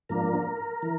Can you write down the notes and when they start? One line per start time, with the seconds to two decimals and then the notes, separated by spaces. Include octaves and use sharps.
0.09 G#2 F3 A#3 D4 A#4
0.82 E3